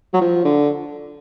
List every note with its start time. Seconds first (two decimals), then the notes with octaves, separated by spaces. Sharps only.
0.13 F#3
0.21 F3
0.45 D3